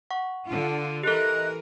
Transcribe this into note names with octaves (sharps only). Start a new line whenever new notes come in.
F#5 C#6
D3 D4 F4
E3 G4 A4 A#4 D#5 F#6